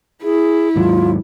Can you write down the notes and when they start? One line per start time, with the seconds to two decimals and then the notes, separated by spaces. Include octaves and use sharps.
0.23 E4 G#4
0.76 D#2 G#2 F#3 F4